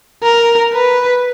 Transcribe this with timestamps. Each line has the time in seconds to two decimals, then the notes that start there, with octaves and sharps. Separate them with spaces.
0.23 A#4
0.73 B4